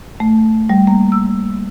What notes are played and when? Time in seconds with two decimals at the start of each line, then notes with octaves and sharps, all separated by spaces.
0.20 A3
0.69 G3
0.87 A#3
1.12 E6